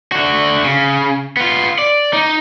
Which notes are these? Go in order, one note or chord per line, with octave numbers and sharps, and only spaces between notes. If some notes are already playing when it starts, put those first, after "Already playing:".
D3 F#4
C#3
B3 F4
D5
D#4